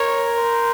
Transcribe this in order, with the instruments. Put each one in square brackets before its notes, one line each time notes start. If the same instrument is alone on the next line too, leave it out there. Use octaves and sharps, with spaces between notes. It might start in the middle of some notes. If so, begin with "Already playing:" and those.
Already playing: [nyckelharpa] A#4 [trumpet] C#5
[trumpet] C5